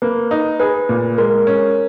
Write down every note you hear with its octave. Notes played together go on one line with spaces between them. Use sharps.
A#3 B4
D#4
G#4 B4
A#2
G#3 A#4
C#4